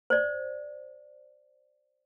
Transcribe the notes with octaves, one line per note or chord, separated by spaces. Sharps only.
C5 D5